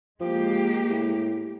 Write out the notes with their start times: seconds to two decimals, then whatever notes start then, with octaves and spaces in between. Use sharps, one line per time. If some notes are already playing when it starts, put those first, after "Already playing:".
0.20 F3 G#3 A#3 G4
0.90 A2